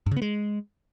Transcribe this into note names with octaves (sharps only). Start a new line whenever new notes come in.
G2
C#3
B3
G#3